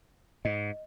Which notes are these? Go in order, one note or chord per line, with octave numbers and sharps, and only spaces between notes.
G#2 D#5